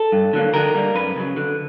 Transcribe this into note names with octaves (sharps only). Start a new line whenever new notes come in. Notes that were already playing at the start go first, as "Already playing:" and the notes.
Already playing: A4
G2
D3 F#3 A#3
D3 A#4
G3 A#3
F#2 B4
C#3 F#3
D3